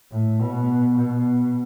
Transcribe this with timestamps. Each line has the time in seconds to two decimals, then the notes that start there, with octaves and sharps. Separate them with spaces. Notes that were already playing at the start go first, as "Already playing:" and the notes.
0.11 A2
0.40 B2
0.96 B2